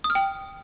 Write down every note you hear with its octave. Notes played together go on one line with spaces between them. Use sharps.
D#6
F6
G5